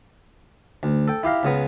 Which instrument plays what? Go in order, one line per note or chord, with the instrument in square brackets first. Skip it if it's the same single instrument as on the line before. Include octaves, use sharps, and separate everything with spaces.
[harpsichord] D2
A4 G5
E4 G4 F5 A#5
C#2 C#3 B3 A#5